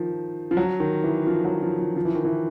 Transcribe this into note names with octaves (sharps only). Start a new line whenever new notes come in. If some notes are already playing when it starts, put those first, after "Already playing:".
Already playing: D#3 F3
F3
F#3
D#3
E3
F3
F#3
F3
F3
F3
E3
D#3
E3